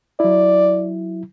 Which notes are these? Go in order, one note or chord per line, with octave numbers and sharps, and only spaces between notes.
F#3 E4 D5